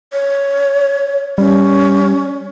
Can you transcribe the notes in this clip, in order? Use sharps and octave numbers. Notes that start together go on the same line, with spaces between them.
C#5
G3 C#4